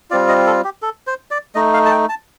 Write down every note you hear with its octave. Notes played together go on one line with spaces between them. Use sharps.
G3 C4 F4 D5
D#5
A4
G4
A4
C5
D5
A3 D#4 D#5
F5
A5
G5
A5